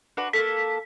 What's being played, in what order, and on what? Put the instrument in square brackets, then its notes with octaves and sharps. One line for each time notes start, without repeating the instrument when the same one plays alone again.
[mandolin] D4 F#4 B4
[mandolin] A#3 C#4 A4 [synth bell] B6